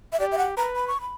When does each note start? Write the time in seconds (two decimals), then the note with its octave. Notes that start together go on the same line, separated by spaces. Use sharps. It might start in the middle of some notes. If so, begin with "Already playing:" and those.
0.13 E5
0.20 G4 D5
0.32 E5
0.38 F#5
0.57 B4 A#5
0.76 B5
0.88 C#6
1.01 B5